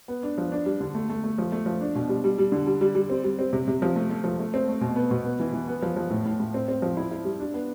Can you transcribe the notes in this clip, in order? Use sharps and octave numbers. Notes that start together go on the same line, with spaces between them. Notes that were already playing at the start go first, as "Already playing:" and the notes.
B3
D4
F3
D4
G3
D3
A3
A3
A3
F3
A3
F3
D4
B2
G3
G3
G3
D3
G3
G3
G3
C4
G3
C4
C3
C3
F3
A3
A3
F3
A3
C4
A3
B2
B3
B2
B3
E3
E3
B3
F3
F3
A2
A2
A2
C4
C4
F3
E4
E4
G3
D4
B3